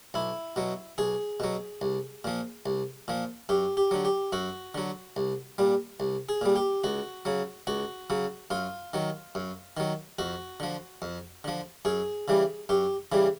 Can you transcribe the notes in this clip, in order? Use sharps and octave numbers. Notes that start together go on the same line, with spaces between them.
B1 E4
B2 F#3
B1 G#4
B2 F#3
C2
A#2 F3
C2
A#2 F3
F#2 G4
G4
D3 F#3
G4
F#2 F#4
D3 F#3
C2
A#2 G3
C2
G#4
A#2 G3
G4
C#2 F#4
C#3 F#3
C#2 F#4
C#3 F#3
F#2 F4
D#3 F#3
F#2
D#3 F#3
F2 F#4
D3 F3
F2
D3 F3
F#2 G#4
C#3 E3 G3
F#2 G4
C#3 E3 G3